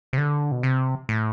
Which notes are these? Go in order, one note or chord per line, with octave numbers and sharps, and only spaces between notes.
C3
D3
B2
C3
A2